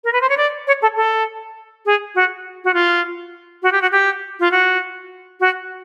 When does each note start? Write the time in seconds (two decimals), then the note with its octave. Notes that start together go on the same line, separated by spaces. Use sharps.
0.04 A#4
0.13 B4
0.21 C5
0.29 C#5
0.37 D5
0.67 C#5
0.82 A4
0.97 A4
1.86 G#4
2.15 F#4
2.64 F#4
2.74 F4
3.63 F#4
3.72 G4
3.82 F#4
3.92 G4
4.40 F4
4.51 F#4
5.40 F#4